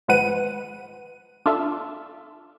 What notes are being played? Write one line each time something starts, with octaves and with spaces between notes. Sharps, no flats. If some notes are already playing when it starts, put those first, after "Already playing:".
G#1 F3 G#3 B4 F#5 D#7
D4 F4 A4 E5